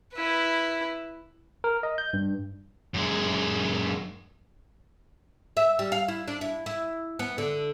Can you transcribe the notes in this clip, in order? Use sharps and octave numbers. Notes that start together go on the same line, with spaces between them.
E4 B4
A#4
D#5
G6
G2
F#2 G#3
E5
G3
F5
E4
D4
E4
E4
B3
D3